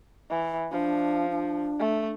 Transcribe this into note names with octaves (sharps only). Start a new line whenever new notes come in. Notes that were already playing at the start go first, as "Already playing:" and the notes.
E3
F3 D4
D4
A3